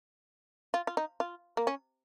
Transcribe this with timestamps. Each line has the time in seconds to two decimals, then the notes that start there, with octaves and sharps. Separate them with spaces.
0.74 F4
0.87 F4
0.97 D#4
1.20 F4
1.57 A#3
1.67 C#4